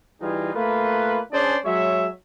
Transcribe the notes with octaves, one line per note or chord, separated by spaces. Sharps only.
E3 G3 D#4 F4 G#4
A3 A#3 F4 B4
C#4 D4 G#4 C5 D5
F#3 G#3 C#5 E5